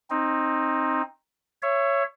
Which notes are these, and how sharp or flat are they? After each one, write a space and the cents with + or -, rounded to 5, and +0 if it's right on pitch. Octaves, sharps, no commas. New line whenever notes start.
C4 +20 D#4 +0
C#5 +0 E5 +30